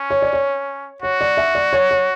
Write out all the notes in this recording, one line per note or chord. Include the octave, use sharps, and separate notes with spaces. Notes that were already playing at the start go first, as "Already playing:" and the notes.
Already playing: C#4
C#5
D5
C#5
F#4 C#5
D5
E5
D5
C#5
C#5